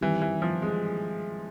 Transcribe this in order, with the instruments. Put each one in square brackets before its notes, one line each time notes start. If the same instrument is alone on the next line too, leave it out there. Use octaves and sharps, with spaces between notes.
[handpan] D#3 G3 C4 E4 G4 [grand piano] E3
[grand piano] E3
F3
G#3